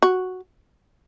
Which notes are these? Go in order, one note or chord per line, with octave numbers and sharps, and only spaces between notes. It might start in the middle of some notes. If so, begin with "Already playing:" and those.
F#4